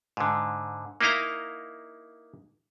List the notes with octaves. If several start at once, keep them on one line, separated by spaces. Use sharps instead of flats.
G#2 D3
A#3 D#4 E4 D#5 F5 A#5